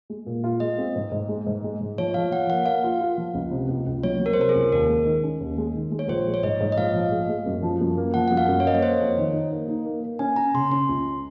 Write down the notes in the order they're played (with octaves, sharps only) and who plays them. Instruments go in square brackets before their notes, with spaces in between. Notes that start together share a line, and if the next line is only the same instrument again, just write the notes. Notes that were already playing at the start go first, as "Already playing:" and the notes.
[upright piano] G#3
A#2
F4
[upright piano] G#3 [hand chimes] D#5
[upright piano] C4
G#2
G#2
G#3
G#2
G#3
G#2
[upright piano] F3 [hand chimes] C#5
[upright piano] F3 [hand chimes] F5
[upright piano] F3 [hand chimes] F#5
[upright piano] A#3 [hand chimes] F#5
[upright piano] A#3 [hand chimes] F5
[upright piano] F4
F4
F3
C#2
C3
C#2
C#2
[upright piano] F#3 [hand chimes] C#5
[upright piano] F#3
[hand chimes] A#4
C5
[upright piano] C3 [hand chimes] A#4
[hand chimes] G#4
[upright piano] C#2
[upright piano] D#2 [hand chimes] A#4
[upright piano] G#3
D#3
C#4
D#2
G#3
D#3
G#3
[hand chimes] C#5
[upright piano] A#1 [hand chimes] C5
[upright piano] G#3
[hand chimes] C#5
[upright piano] G#2 [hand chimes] D#5
[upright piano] G#2
[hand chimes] D#5
[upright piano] A#1 [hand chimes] F5
[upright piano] F3
G#3
G#3
F#2
F3
F#2
A#3
[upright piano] F3 [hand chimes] F#5
[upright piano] F#2 [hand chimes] F#5
[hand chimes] F5
[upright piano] F#2
[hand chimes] C#5
[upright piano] A#3 [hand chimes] D#5
[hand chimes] C#5
[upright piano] A#3 [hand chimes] C5
[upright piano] F2
D#3
D#4
A#3
D#4
A#3
A#3
[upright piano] C#4 [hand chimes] G#5
[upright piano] C#4 [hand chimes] A#5
[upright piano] C#3 [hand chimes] C6
[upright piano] C#4 [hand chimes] C6
[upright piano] C#2